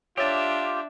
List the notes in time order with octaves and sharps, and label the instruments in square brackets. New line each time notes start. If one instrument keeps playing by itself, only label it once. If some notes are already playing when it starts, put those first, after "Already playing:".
[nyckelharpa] D4 E5 [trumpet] F4 [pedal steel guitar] G4 [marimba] C#5 A6